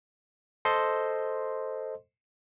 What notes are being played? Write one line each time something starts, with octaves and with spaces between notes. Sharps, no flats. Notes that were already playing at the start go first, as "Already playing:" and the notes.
A4 C5 D#5 C6